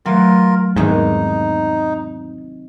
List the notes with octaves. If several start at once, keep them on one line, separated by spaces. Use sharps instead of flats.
E3 F#3 A3 F4 A#4
E2 G#2 C3 D#3 E3 D#4